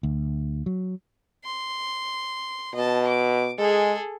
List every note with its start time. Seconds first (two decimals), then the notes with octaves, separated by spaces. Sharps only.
0.03 D2
0.66 F#3
1.45 C6
2.75 B2 D#5 A5
3.07 D6
3.59 G#3 G#4 A4